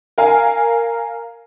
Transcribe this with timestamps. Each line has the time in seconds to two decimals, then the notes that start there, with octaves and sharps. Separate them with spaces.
0.18 A#4 F5 G#5